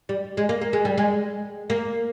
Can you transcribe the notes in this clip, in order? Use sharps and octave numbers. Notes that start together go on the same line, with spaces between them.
G3
G#3
A#3
A#3
G#3
G3
G#3
A#3